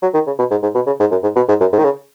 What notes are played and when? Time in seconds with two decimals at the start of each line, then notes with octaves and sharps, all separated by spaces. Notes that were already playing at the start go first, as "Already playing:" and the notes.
0.03 F#3
0.14 D#3
0.27 C#3
0.39 B2
0.51 G#2
0.63 G#2
0.75 B2
0.87 C#3
1.00 G#2
1.11 F#2
1.23 G#2
1.36 B2
1.49 G#2
1.61 F#2
1.73 G#2
1.79 D#3
1.85 C#3